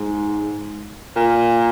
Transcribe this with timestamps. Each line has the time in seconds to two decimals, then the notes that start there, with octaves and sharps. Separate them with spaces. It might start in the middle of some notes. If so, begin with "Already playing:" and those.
Already playing: G#2
1.16 A#2